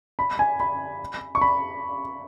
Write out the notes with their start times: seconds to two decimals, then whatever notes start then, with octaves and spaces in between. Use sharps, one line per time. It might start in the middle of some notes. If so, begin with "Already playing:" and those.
0.19 B5
0.39 G#5
0.60 B5
1.35 C#6
1.41 B5